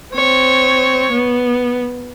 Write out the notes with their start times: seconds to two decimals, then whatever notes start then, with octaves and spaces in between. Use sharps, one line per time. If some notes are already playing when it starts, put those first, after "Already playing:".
0.15 C4 C#5
1.12 B3